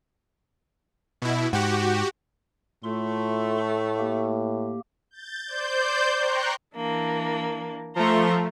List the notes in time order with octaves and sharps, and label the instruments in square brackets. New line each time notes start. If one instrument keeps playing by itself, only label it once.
[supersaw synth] B2 E4
[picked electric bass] G#2 [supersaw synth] F#4 G4
[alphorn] A2 [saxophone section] A3 [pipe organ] F4 C6
[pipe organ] A#3 G4
[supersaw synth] G6 A6
C5 D5 G6
G5 A#5 C6 C#6 F#6
[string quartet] E3 A#3 D4
[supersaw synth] F3 A3 [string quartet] A#5 C6 C#6